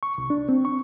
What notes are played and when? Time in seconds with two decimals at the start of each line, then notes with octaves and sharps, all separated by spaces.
0.03 C#6
0.18 C2
0.30 D4
0.49 C4
0.65 C#6